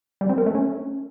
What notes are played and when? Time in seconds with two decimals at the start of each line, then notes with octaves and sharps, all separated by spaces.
0.21 G3
0.29 C4
0.38 A#4
0.46 A3
0.55 C#4